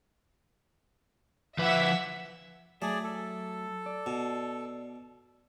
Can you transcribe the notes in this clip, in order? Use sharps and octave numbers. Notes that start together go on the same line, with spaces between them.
F3 B4 E5 F#5 B6
F#3 A3 G#4 D5
A4
D5
B2